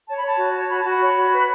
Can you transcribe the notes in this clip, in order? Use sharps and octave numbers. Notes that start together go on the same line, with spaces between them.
C#5 A5
B5
C#5 A5
F#4
C#5
F#4 B5
F#4 A5
B5
C#5
F#4
B4